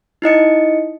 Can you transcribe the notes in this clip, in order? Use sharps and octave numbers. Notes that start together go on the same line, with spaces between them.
D#4 E4 D#5 C#7